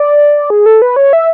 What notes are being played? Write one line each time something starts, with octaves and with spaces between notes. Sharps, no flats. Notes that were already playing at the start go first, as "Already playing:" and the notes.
Already playing: D5
G#4
A4
B4
C#5
E5